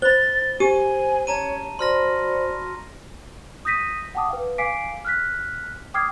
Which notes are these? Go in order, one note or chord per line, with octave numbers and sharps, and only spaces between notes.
C5 B5 A6 G7
G4 C5 G#5 D#7
C#4 C#5 A5 A#5 D#7
F#4 C5 D5 B5 C6 F6 A#6
D#6 G6 A#6 B6 D#7
F#5 G5 A5 D6 D#6
B4 F5
F5 G#5 D6 B6 C7 D7
F6 F#6 B6
G5 D6 D#6 F6 G#6 C7